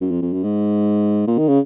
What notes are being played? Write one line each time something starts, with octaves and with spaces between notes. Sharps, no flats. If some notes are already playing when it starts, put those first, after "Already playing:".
F#2
F2
F2
F#2
G#2
A#2
D#3
C#3